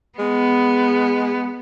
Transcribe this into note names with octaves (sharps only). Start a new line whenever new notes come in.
G#3 B3